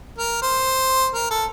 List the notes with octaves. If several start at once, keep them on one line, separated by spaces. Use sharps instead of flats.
A#4
C5
A#4
A4